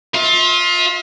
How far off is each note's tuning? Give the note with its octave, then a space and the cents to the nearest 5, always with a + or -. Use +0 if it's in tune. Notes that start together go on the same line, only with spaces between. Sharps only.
F4 +20 E5 -35